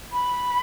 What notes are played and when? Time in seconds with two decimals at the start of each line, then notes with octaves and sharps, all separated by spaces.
0.12 B5